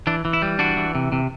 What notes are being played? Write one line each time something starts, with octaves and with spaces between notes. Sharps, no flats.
E3 D4
E3
E4
G3
E3 D4 F#4
E3
C3
C3